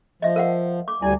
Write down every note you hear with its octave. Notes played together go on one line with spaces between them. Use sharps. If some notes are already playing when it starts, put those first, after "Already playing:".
F3 D#5 E5
A#4 F5 F#5
D6
D2 G3 E4 G#5